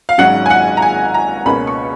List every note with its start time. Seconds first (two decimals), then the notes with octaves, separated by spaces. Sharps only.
0.09 F5
0.18 G#1 G#2 F#3 C#4 F#5
0.46 G#5
0.50 F#5
0.77 A#5
0.82 G#5
1.14 A#5
1.45 C#2 B2 A#3 C#4 B5
1.67 C#6